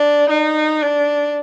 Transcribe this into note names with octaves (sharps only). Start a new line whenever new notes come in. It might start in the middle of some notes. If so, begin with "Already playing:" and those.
Already playing: D4
D#4
D4